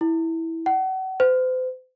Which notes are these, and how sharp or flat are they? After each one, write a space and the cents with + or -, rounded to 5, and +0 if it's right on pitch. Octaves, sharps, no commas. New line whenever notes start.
E4 -10
F#5 +35
C5 -40